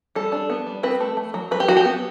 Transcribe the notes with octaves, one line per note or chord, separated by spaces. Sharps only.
G3 A4
D4
B3
G3
C4 B4
A3
A3
F#3
F#3 B4
G4
F#3 F#4
G4
B3